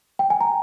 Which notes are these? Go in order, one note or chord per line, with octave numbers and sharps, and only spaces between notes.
G5
G#5
A#5